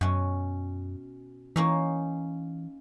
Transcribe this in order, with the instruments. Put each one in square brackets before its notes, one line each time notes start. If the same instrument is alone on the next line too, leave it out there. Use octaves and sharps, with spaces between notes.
[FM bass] F#2 [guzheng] B2 C#4
[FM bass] E3 [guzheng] A#3 C#4 D#4